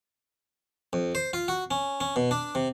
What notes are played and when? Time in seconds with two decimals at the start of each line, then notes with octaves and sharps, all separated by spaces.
0.93 F2
1.15 C5
1.33 F4
1.48 F#4
1.71 C#4
2.01 C#4
2.16 B2
2.31 D4
2.55 C3